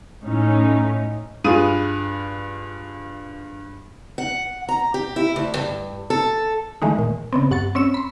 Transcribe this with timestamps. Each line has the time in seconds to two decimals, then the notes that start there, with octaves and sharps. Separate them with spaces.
0.25 A2 C#4 D#4
1.44 G2 F4 G#4 D#6 D#7
4.18 F#5
4.69 A#5
4.94 G4
5.16 E4
5.36 D2
5.55 G2
6.10 A4
6.82 D#3 E3 G#3 A3 D#4
6.99 A#2
7.33 C#3 B3 C4
7.51 G2 F#5 C#6 A6
7.75 C4 C#4 C#5 E6 E7
7.94 B5 C6